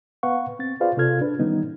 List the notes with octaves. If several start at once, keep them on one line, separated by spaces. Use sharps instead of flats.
B3 B4 F5 F#5 C#6
C4 A6
F4 G#4 B4 C5 D5 F5
C3 F4 A4 F6 G#6
D4 B4
D#3 E3 G3 B3 C#4 D#4